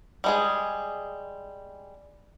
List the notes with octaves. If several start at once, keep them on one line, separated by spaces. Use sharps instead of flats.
G3 G#3 G#4